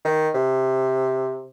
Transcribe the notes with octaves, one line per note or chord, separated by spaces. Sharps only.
D#3
C3